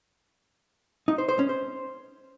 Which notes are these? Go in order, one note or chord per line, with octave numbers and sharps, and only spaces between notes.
D#4
C5
C5
C#4
C5